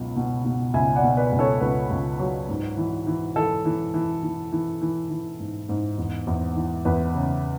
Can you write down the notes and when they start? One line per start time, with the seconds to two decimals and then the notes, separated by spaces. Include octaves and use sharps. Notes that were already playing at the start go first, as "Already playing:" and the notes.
Already playing: C#2 B2 F#3
0.16 B2
0.45 B2
0.73 C#2 E5 G#5
0.96 D5 F#5
1.03 B2
1.17 B4 D5
1.32 C#2
1.39 A4 C#5
1.61 C#2 B4
1.90 C#2
2.19 F#3
2.49 G#2
2.77 E3
3.07 E3
3.36 E3 A4
3.65 E3
3.94 E3
4.23 E3
4.52 E3
4.81 E3
5.10 E3
5.40 G#2
5.69 G#2
5.98 E2
6.27 E2
6.56 E3
6.85 E2 B4
7.15 C#3